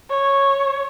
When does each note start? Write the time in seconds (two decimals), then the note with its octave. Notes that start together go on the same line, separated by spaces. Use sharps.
0.10 C#5